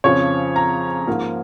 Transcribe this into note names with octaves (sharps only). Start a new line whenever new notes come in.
F2 C#3 F3 C#5
A#5
G#2 F3 A#3